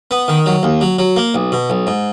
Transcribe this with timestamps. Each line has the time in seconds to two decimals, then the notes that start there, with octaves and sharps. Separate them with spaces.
0.11 B3
0.28 D#3
0.46 F#3
0.63 D#2
0.81 F#3
0.99 F#3
1.16 A#3
1.34 B1
1.52 B2
1.70 B1
1.87 G#2